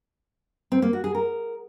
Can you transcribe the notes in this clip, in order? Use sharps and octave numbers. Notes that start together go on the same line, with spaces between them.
C4
A#3
F#4
G#4
A#4